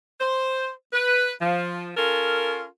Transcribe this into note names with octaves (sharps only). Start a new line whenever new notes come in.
C5
B4
F3
C#4 F4 A4 A#4